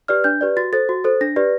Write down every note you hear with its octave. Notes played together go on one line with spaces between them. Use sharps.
G4 B4 D5 F6
D4 G6
G4 B4 D5
F#4 A6
A4 C5 A6
F#4
A4 C5
D4 A#6
G4 B4 D5